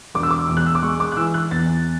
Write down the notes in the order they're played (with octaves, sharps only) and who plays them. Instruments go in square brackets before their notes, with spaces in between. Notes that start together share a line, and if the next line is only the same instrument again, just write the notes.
[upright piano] E1 D6
E6
D6
E2
F#6
E6
D6
G#3 C#6
D6
F#6
E3 E6
F#6
E2 A6